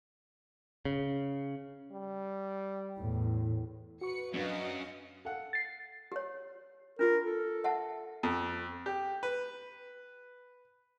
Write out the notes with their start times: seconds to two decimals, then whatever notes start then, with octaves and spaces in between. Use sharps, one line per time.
0.85 C#3
1.91 G3
2.98 E2 A2
4.01 F#4 B4 C#6 C#7
4.34 F#2 F#3 C#4 D4 B4 D#5 F5
5.25 A4 F5 F#5
5.53 A6 C7
6.12 G4 C#5
6.99 D4 F4 G4 A#4
7.24 A4
7.64 E5 F#5 A5
8.23 F2
8.86 G4
9.23 B4